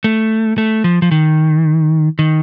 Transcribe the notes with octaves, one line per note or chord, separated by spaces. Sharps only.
A3
A3
F3
F3
D#3
D#3